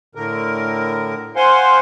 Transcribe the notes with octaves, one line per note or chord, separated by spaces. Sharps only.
A2 D3 A#4
C5 F5 F#5 G#5 C6